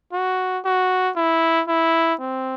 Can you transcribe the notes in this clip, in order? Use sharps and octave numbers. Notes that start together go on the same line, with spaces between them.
F#4
F#4
E4
E4
C4